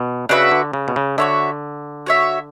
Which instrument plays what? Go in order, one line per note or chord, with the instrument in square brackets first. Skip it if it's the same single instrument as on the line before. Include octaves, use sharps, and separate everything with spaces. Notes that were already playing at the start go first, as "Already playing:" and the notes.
Already playing: [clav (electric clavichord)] B2
[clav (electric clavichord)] C#3 [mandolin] D4 F#4 B4 E5
[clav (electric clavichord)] D3
C#3
B2
C#3
[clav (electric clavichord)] D3 [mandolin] F#4 C#5 E5
[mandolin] F#4 C#5 E5